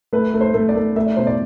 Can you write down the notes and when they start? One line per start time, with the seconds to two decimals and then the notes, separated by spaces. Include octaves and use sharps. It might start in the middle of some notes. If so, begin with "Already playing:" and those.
0.13 A3 B4
0.34 A3
0.41 C5
0.54 A3
0.69 D5
0.76 A3
0.96 A3 E5
1.06 D5
1.17 B2 C5
1.27 D5